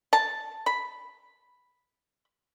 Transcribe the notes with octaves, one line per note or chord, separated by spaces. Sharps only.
A5
B5